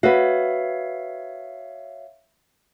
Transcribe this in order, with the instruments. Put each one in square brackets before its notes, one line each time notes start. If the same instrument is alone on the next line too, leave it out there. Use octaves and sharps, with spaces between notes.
[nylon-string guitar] F#4 B4 [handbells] C#5 E5 F5